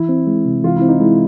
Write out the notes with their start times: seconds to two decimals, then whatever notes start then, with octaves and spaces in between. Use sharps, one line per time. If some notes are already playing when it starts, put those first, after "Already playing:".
Already playing: E3 E4
0.09 C4
0.27 G#3
0.46 C3
0.64 E3 F4
0.76 E4
0.82 C4
0.88 D#4
1.00 G#3 E4